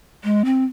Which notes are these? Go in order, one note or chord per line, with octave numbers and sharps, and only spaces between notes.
G#3
C4